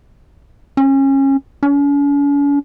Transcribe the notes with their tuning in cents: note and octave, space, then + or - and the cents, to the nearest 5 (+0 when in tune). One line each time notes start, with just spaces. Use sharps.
C#4 -25
C#4 +45